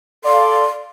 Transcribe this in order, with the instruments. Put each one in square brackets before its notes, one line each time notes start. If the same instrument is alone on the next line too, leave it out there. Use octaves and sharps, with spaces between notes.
[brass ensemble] A4 D5 F5 [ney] C6